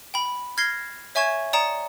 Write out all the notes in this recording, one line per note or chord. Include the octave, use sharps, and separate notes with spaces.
G5 B5
F6 G#6 A#6 C7 G7
C#5 E5 G#5 C#6 G#6 E7
D5 G5 A#5 D#6 C#7 E7